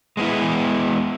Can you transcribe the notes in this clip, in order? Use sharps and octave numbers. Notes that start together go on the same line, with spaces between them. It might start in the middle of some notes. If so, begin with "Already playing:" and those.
G#3 B3 E4